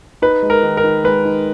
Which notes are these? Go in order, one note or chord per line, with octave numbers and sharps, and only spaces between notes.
D#4 B4
G#3
A#4
D#3
A#4
D#3
G#3 B4
D#4